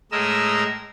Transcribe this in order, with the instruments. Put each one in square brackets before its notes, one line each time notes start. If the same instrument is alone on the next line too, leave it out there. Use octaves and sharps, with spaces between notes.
[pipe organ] A2 G#3 A#4 D#5 E6